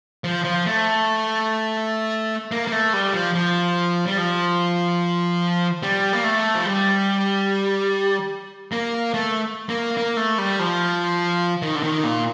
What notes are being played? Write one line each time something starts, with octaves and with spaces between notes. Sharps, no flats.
F3
F3
A3
A#3
A#3
A3
G3
F3
F3
G3
F3
G3
A#3
A3
F3
G3
A#3
A3
A#3
A#3
A3
G3
F3
D#3
D3
D#3
A#2